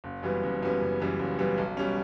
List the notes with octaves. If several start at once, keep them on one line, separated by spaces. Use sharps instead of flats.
F#1
F#2 E3 G3 B3
F#1
F#2 E3 G3 B3
F#1
F#2 E3 G3 B3
F#1
F#2 E3 G3 B3
B1
B2 G3 C#4